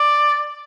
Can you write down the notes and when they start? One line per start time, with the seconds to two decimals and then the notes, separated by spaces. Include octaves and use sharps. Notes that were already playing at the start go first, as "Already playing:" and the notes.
Already playing: D5